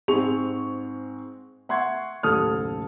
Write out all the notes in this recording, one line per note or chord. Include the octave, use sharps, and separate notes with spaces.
G#2 G#3 C4 C#6 F7
E5 F#5 C6 C#6 G#6
F#1 D#2 A2 A4 D#6 F6